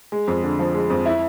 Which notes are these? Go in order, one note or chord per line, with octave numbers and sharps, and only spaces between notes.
G#3
F2
D3
F3
G#3
F2
E4